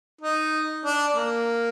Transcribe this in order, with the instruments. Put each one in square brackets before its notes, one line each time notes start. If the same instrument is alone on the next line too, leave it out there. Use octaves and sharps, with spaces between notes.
[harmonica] D#4
D4
A#3